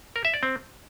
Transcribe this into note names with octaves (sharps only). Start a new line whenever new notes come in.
A#4
E5
D5
C4